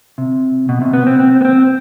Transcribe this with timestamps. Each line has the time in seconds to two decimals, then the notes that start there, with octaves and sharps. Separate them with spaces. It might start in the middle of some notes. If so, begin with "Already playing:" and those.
0.18 C3
0.69 B2
0.82 C3
0.93 B3
1.07 C4
1.19 C4
1.41 B3
1.45 C4